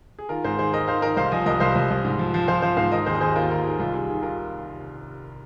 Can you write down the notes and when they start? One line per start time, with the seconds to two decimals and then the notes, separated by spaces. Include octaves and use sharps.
0.19 G#4
0.29 D#3 F4 A#4
0.44 G#2 G#4 C5
0.59 D#3 G#4 C5
0.73 D#3 A#4 D#5
0.88 D#3 C5 F5
1.02 D#3 A#4 D#5
1.17 C2 C5 F5
1.32 F3 D#5 G#5
1.46 C2 A#4 D#5
1.60 C2 C5 F5
1.76 C2
1.90 C2
2.04 G#2
2.19 F3
2.34 F3
2.48 F3 C5 F5
2.62 F3 C5 F5
2.77 G#2 C5 F5
2.92 D#3 A#4 D#5
3.06 D#2 G#4 C5
3.15 D#5
3.20 D#2 G#4 C5
3.36 D#2 F4 A#4
3.50 D#2 F4 A#4
3.64 D#3 G#4
3.79 C2 F4
3.93 C3 G#4
4.09 D#3 G#4
4.22 F4 A#4